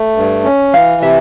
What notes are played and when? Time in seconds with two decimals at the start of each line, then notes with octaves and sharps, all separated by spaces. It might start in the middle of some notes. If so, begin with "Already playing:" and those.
Already playing: A3
0.16 G2
0.44 C#4
0.73 E3 F5
1.02 C3 E5